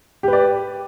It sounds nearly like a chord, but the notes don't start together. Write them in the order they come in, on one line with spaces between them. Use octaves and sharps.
G4 B4 D5